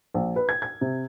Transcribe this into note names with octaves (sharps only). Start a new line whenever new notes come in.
A#1
B4
G#6
G#6
C3